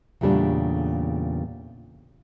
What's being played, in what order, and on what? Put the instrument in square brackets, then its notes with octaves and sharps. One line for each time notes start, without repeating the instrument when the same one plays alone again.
[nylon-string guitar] E2 A#2 C#3 G3 A3 D4